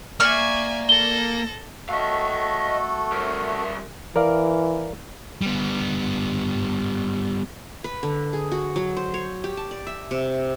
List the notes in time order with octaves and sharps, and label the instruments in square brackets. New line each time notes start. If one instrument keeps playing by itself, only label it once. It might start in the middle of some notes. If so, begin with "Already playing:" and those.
[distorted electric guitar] A#3 [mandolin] D5 C#6 F6 [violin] E5 G#5
[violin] A4 A#6 [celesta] G7
[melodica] A3 F#4 A4 [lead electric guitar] D#5 F5
[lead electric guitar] G3 A#4
[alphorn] E3 [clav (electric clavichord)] A#4 D5 F5
[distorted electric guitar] G3 B3
[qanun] B4
D3
G#4
F#4
F#3
C5
C#5
G4
A5
D5
E5
C3